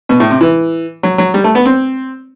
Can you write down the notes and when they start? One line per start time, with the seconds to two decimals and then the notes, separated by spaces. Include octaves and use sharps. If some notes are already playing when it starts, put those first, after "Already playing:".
0.09 B2
0.20 A2
0.30 C3
0.41 E3
1.03 F#3
1.18 F#3
1.34 G3
1.44 A3
1.55 B3
1.65 C4